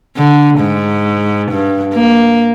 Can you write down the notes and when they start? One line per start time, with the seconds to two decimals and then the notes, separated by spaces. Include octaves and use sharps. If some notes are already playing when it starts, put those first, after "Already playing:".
0.17 D3
0.59 G#2
1.51 G2
1.94 A#3